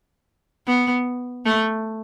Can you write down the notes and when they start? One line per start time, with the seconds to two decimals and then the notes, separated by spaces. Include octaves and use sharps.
0.67 B3
1.46 A3